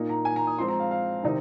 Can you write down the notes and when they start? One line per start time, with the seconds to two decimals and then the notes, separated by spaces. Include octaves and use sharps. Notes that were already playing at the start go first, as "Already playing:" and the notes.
Already playing: A#2 A#3 D#4
0.09 A#5
0.25 G#5
0.36 A#5
0.47 D#6
0.58 F3 G#3 C4 C6
0.68 A#5
0.80 F5
0.91 F5
1.24 C3 D#3 C4 D#4